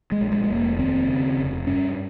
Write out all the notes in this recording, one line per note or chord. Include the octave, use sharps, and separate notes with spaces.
G#3
A#1
G#3
G#3
F1 A#3
D#2 C4
C#3
F1
G2 C#4